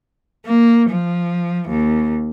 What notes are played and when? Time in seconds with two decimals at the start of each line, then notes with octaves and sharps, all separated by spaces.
0.46 A#3
0.91 F3
1.69 D#2